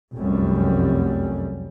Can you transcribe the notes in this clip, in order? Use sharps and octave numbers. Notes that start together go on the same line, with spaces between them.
F1 C2 F#2 G3